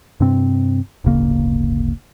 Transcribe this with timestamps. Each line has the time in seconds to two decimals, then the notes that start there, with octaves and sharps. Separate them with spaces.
0.20 G2 C3 C4
1.04 D1 G1 C#3 A#3